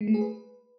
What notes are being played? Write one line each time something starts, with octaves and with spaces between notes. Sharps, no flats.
G#3
A3
G#4
B4